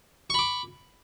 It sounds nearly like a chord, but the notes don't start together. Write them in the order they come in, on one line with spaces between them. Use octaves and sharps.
C#6 B5 D6